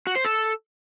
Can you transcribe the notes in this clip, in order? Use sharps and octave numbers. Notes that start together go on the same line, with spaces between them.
F#4
C5
A4